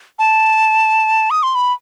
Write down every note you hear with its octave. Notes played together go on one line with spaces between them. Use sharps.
A5
D#6
C6
B5